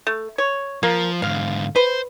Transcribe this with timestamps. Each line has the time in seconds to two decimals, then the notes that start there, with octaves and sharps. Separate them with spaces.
0.07 A3
0.38 C#5
0.83 F3 A#3
1.22 G#2 D3 F5
1.76 B4 C5